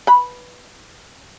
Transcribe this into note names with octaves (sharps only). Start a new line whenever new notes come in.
B4 B5